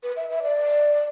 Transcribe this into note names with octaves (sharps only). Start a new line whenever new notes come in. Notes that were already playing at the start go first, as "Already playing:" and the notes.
B4
E5
E5
D5